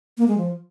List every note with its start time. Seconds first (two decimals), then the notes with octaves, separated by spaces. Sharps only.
0.18 A#3
0.28 G#3
0.38 F3